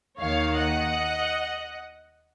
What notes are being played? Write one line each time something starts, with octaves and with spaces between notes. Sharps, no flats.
D#2 D#3 A#3 C#5 F5
D#5 F#5